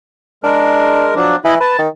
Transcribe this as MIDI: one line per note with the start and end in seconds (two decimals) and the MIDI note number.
0.44 1.15 56
0.44 1.13 62
0.44 1.15 70
1.15 1.36 53
1.15 1.36 54
1.15 1.36 62
1.45 1.58 52
1.45 1.54 64
1.45 1.54 75
1.45 1.54 83
1.61 1.75 71
1.61 1.81 81
1.79 1.88 51